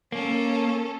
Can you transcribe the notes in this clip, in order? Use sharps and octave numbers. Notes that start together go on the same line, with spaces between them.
A#3 C#4 A4